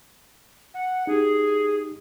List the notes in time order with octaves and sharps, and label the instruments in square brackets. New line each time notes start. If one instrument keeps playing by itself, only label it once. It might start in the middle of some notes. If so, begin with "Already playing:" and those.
[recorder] F#5
[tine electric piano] D#4 G4 [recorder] G#4